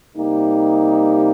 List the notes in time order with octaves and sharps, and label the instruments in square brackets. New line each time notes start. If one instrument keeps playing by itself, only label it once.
[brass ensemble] C3 G3 A#3 D#4 G4